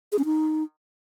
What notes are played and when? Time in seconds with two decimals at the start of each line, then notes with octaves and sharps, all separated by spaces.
0.12 G#4
0.19 C#4
0.25 D#4